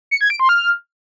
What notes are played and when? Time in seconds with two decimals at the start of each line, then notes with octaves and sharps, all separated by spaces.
0.11 C#7
0.21 G#6
0.30 D7
0.40 C6
0.49 F6